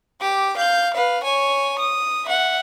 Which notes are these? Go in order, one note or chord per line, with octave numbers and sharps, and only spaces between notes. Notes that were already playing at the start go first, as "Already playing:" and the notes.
G4 D6
F5 G6
B4 F5
C#5 G#5
D#6
E5 F#5